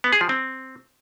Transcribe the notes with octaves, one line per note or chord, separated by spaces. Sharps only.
B3
G#4
F3
C4